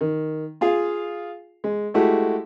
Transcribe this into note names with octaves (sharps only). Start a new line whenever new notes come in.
D#3
F4 G#4 F5
G#3
G#3 A3 E4 F#4 G4 A4